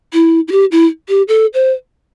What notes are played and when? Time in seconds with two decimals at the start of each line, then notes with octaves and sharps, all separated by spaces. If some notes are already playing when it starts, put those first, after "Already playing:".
0.13 E4
0.48 E4
0.52 G4
0.72 E4
1.09 G4
1.28 A4
1.54 C5